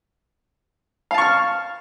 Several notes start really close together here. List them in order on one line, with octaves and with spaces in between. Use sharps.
F5 A5 C#6 F6